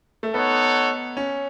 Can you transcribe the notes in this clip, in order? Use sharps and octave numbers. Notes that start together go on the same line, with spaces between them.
A3
B3 D#4 A4 C#5 F#5
C#4